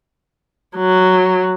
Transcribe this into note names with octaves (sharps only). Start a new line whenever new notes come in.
F#3